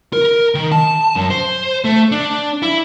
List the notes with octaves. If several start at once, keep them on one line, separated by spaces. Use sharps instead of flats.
A#4
D#3
A5
F#2
C5
A3
D4
E4